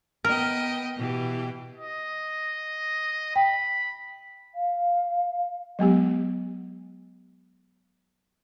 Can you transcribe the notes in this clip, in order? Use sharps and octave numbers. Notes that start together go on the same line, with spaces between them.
B3 A#4 D#5 G5
B2 E3 G4
D#5
G5 B5
F5
F#3 G#3 B3 G4